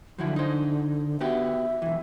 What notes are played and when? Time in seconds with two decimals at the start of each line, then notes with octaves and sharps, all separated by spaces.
0.18 D3 F3 F#3 E4
0.36 D#4 C5
1.21 B3 F#4 G4 E5
1.82 B1 E3